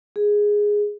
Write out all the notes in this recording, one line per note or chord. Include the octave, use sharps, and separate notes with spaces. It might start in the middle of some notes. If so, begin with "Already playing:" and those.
G#4